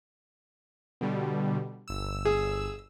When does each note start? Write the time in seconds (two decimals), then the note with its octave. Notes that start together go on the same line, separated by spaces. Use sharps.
1.01 B2 D3 G3
1.88 G1 E6
2.25 G#4